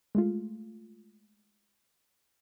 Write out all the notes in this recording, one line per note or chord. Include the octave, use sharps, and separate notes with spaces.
G#3 A3 F4